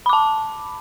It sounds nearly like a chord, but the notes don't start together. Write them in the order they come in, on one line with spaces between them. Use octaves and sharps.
B5 D6 A5